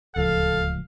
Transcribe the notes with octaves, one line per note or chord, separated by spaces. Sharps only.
D1 C#2 F3 A4 F5